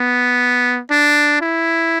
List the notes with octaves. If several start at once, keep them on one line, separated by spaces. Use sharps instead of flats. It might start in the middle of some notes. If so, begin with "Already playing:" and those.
Already playing: B3
D4
E4